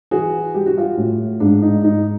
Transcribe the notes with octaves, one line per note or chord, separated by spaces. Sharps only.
E3 F#4 G#4
G3 G4
F#4
F4 G4
A2
G#2 D4
D#4
G#2 D#4